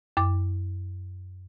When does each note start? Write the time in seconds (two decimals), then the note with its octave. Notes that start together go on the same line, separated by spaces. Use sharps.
0.17 F#2 D6